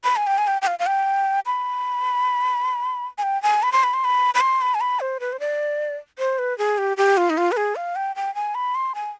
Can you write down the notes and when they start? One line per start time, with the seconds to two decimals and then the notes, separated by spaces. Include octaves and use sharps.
0.04 B5
0.16 G#5
0.27 G5
0.38 G#5
0.47 G5
0.62 G5
0.67 F5
0.79 F5
0.87 G5
1.46 B5
3.18 G#5
3.23 G5
3.43 G#5
3.63 B5
3.72 C6
3.84 B5
3.94 C6
4.04 B5
4.35 B5
4.41 C6
4.61 B5
4.75 G#5
4.81 B5
5.00 C5
5.20 B4
5.33 C5
5.40 D5
6.19 C5
6.39 B4
6.58 G#4
6.78 G4
6.97 G4
7.17 F4
7.30 D#4
7.38 F4
7.52 B4
7.57 G#4
7.76 F5
7.96 G5
8.16 G5
8.35 G#5
8.55 B5
8.75 C6
8.95 G#5